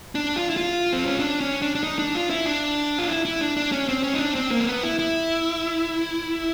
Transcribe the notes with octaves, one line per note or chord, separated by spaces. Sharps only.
D4
F4
E4
F4
C4
C#4
D4
C#4
D4
D4
D#4
D4
F4
E4
D4
F4
E4
E4
D4
D4
C#4
C4
C#4
D#4
D4
C4
A#3
C4
B3
E4
E4